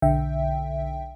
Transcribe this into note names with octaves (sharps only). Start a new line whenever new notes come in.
B1 D3 E5 G5